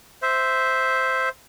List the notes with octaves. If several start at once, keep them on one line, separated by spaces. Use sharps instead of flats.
C5 E5